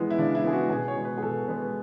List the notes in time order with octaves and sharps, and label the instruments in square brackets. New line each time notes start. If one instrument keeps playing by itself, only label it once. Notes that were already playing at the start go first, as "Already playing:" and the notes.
Already playing: [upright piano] E3 G#3 B3
E4
C#3 D4
E4
E3 G#3 B3 G#4
F#4
B2 G#4
C#5
G#3 B3
B4
G#4
B2 A4
G#3 B3 B4